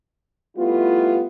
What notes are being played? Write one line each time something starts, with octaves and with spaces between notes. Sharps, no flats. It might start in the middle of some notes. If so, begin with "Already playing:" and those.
G3 A3 B3 E4 F4